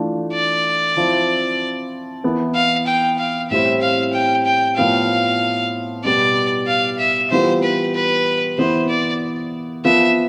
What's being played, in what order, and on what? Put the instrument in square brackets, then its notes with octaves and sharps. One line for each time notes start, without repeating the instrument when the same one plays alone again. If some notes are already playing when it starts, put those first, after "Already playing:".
Already playing: [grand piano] E3 A3 D4 F4
[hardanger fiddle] D5
[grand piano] F3 C4 E4
E3 B3 E4
[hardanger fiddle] F5
G5
F5
[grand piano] A2 G3 C4 E4 [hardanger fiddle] E5
[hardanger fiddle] F5
G5
G5
[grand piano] A2 F3 B3 F4 [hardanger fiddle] F5
[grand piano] B2 G3 B3 [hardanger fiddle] D5
[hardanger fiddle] F5
E5
[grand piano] E3 G3 B3 F4 [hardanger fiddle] C5
[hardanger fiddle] B4
B4
[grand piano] E3 B3 E4 [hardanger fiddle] C5
[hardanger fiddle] D5
[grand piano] F3 B3 F4 [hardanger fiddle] E5